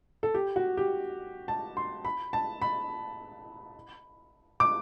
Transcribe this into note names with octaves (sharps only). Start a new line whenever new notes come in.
A4
G4
F#4
G4
A5
C6
B5
A5
B5
D6